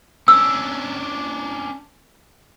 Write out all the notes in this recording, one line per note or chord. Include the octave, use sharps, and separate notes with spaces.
C#4 D4 E6